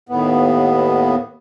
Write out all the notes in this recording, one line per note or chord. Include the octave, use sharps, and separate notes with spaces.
D#2 A2 B3